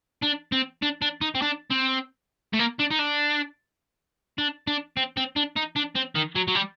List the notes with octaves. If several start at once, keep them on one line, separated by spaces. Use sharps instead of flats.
D4
C4
D4
D4
D#4
C4
D4
C4
A3
A#3
D4
D#4
D4
D4
D4
C4
C4
D4
D#4
D4
C4
D#3
F#3
F#3
G3